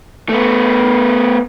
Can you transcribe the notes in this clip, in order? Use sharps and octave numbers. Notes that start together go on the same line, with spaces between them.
A3 B3